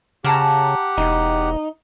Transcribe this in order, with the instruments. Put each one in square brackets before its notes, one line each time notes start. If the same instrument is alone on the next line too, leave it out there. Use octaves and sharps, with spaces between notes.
[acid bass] C#3 [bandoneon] G4 F#5 [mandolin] A5 A#5 F6
[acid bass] E1 [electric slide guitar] D#4